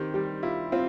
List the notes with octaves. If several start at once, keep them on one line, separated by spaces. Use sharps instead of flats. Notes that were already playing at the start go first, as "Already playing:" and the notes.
Already playing: D#3 C4 G4
G3 G4
E4 F4
C4 F4